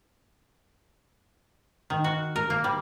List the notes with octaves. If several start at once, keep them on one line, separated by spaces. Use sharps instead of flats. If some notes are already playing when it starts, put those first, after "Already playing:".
D#3
F#4
A#4
A#3
G3